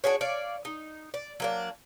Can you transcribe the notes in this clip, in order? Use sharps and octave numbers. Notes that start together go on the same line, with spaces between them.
D4 F#4 G#4 C#5
C#5 D5 F5
D#4
D5
F#3 A#3 D4